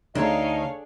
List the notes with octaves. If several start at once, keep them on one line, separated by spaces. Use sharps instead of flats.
D2 D4 D#4 G#4 A4 C#5 D#5 F5